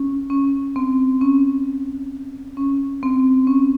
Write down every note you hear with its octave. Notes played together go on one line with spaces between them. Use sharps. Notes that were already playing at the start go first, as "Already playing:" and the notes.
Already playing: C#4
C#4
C4
C#4
C#4
C4
C#4